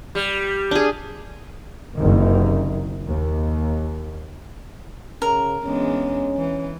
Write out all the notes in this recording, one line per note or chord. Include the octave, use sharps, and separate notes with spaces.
G3
D4 G#4
F#1 C3 D#3
D#2
C#3 A#4
E2 G#3 C#4 D4
E3